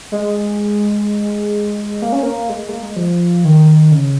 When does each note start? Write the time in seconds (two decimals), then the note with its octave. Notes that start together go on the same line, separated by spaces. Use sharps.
0.12 G#3
2.02 A#3
2.12 C#4
2.23 A#3
2.50 G#3
2.69 A#3
2.83 G#3
2.96 F3
3.44 D#3
3.92 C#3